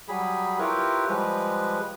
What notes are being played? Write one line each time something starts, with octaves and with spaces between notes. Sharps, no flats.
F#3 G3 G#4 B5
E4 F4 G4 A#4 B4 C#5
F3 G3 G#3 B4